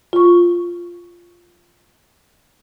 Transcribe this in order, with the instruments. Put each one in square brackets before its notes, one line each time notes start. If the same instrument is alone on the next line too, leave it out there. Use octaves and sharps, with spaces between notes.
[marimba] F4 C#6